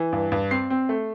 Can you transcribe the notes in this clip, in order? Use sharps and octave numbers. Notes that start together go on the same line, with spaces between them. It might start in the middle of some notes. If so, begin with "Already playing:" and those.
Already playing: E3
G2
G2
C4 C7
C4
A3